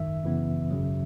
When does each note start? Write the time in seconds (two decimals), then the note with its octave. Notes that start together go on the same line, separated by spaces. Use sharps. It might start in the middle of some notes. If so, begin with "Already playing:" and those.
Already playing: G#1 F#2 D#3 E5
0.23 F#2 C#3 E3 B3
0.71 G#1 F#2 C#3 F#3